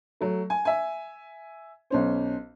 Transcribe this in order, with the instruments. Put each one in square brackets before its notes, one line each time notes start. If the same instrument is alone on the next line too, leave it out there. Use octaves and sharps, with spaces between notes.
[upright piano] F#3 A3
G#5
E5 G#5
B1 C#4 C5